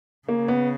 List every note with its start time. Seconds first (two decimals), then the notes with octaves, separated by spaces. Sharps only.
0.28 C#3 A#3
0.48 B3